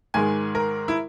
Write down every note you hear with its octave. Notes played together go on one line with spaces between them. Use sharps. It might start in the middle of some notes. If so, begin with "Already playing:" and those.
G#2 D#3 G#3 G#5
A#4
E4